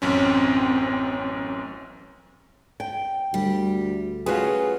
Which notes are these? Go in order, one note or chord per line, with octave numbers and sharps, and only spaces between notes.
A1 F#2 C4 C#4
G5
D2 G3
A3 C#4 F4 F#4 G#4 B4